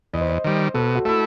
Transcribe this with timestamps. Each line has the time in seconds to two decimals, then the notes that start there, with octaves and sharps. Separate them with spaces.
0.13 E2 D#5
0.21 C5
0.29 D#5
0.44 D#3 G3 C5
0.74 B2 A4
0.95 F#4
1.05 A3 E4 A4